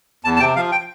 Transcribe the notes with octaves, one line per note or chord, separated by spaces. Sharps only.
E2 A5
A5
C3 G5
F3 F5
G5